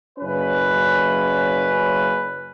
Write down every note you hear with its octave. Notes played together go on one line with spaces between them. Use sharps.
F#1 C#4 B4